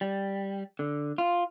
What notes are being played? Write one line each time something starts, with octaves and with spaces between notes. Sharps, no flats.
G3
D3
F4